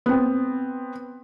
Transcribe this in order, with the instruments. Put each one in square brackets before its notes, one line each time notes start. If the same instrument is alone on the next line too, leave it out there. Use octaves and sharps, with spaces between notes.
[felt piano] B3 C4